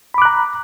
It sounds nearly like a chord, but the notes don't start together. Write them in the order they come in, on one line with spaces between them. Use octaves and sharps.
B5 D6 F#6 A#5